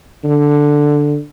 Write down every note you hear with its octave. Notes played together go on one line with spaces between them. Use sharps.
D3